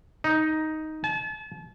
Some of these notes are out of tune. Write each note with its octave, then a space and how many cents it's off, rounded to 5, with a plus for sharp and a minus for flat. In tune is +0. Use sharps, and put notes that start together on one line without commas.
D#4 +5
A5 -40